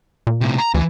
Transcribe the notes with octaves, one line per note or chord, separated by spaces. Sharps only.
A#2
A2 C3
A#5
D2 E3